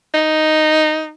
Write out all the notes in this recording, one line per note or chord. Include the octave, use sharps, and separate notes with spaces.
D#4